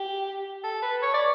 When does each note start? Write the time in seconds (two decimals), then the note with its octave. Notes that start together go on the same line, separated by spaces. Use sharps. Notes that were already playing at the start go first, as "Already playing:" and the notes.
Already playing: G4
0.64 A4
0.82 B4
1.02 C#5
1.14 D5